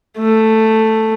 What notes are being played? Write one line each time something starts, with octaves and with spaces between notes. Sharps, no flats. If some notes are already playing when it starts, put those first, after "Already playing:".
A3